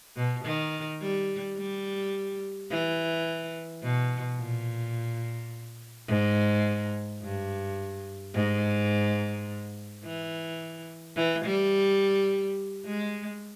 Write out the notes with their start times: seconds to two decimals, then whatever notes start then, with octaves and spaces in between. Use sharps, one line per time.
0.16 B2
0.45 D#3
1.01 G3
1.57 G3
2.70 E3
3.83 B2
4.39 A#2
6.08 G#2
7.22 G2
8.34 G#2
10.04 E3
11.16 E3
11.45 G3
12.86 G#3